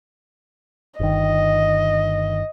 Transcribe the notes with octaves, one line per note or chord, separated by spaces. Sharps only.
G1 D#3 D#5